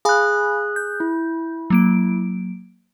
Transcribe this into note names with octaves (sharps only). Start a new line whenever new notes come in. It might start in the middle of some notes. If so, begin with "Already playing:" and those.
G#4 F5 G#5 B5 F#6
G6
E4
F#3 A#3 D7